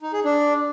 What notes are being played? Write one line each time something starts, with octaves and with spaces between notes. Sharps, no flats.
D#4
G#4
D4